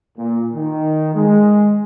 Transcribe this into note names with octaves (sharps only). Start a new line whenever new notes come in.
A#2
D#3
G#3